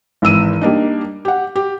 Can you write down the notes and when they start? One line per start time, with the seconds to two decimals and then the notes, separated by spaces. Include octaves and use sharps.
0.22 G#1 E3 E6 D#7
0.61 G3 A#3 D4 D#4
1.25 G4 F#5
1.56 G4